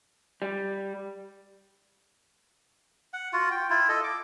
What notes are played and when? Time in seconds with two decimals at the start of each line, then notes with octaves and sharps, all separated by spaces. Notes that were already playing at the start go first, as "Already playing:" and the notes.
0.42 G3
3.13 F#5
3.33 F4 F#4
3.51 G5
3.70 E4 F4
3.89 A4 D#5
4.04 D6